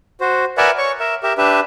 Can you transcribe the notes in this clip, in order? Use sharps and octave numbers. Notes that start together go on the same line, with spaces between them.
F#4 C5
A#4 B4 D5 E5 F#5 G#5
C#5 C#6
A#4 E5
G4 A#4 E5
D4 G4 B4 E5